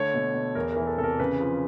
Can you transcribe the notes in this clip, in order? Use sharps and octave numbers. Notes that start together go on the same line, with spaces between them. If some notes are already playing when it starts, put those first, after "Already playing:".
Already playing: D3 A3 C#5
B2
B2
E2 A#4
E3 A#4
A4
C3 A4
A#4
C#3 B4
F3